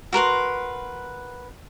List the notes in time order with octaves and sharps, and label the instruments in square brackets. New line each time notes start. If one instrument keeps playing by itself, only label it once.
[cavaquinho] F#4 A#4 B4 C6